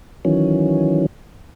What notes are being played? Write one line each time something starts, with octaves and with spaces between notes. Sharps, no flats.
D#3 E3 F#3 C#4